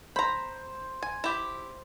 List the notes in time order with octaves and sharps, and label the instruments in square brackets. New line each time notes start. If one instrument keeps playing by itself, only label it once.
[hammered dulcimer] C5 [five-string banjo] A#5 B5
[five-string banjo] G#5
E4 G4